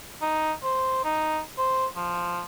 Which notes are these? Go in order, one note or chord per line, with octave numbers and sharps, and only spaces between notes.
D#4
C5
D#4
C5
F3